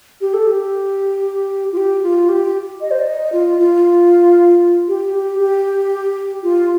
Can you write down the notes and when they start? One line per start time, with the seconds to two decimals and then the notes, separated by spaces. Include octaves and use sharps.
0.21 G4
0.34 A4
0.47 G4
1.72 F4
1.77 G4
2.03 F4
2.29 G4
2.81 D#5
2.91 C5
2.99 D5
3.06 D#5
3.32 F4
3.59 F4
4.88 G4
5.13 G4
5.39 G4
6.43 F4